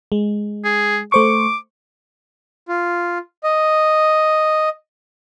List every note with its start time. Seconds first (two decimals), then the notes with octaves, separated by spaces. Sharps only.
0.12 G#3
0.65 G#4
1.12 A3 C5 C#6 D6
2.68 F4
3.44 D#5